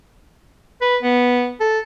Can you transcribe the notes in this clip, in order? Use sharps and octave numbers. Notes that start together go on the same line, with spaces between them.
B4
B3
A4